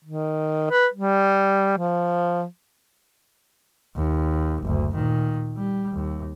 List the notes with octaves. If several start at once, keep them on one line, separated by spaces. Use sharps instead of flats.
D#3
B4
G3
F3
D#2
F#1 D2
A#2 D#3
G3
D#2